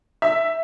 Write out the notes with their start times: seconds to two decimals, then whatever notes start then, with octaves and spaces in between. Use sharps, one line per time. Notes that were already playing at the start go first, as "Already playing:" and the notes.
0.22 E5